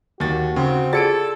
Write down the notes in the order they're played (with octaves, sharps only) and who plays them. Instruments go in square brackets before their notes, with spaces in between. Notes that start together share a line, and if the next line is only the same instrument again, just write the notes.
[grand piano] D#2 A6 [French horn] F#4
[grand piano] C#3 [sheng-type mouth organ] C4
[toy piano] F4 G#4 D5 [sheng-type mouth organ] A4 [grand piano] A6 C#7 D7